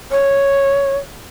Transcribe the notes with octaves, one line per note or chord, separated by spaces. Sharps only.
C#5